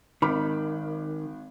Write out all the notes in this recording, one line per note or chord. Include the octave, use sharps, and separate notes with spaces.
G#1 D#3 B5 D6